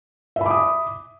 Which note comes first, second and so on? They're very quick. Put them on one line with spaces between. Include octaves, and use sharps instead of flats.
E5 B5 D6 D#6